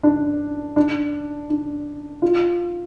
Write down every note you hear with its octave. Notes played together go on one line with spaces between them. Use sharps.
D4
D4
D4
F4